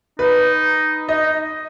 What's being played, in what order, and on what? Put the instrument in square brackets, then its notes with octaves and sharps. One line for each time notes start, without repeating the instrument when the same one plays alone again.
[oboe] D#4 [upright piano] B4
[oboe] D#4 [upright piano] D#5